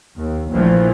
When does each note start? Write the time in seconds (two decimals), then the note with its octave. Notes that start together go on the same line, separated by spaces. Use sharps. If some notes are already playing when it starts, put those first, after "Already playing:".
0.18 D#2
0.50 A#1 E3 F3 A3